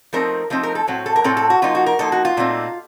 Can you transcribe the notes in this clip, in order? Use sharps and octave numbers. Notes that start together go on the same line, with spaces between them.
F3 A3 C4 D#4 A#4
F3 A3 C4 D#4
A#4
A4
A2 F#3 C4
A4
A#4
A2 F#3 C4 A4
A4
F#4
F3 A#3 D#4 F4
F#4
A#4
F3 A#3 D#4 A4
F#4
F4
A#2 A3 C4 D#4